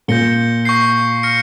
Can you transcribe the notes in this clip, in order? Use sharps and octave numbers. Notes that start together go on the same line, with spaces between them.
A#2 G6 A#6 C#7 G7
C#6 G6 C7
F6 A#6 C#7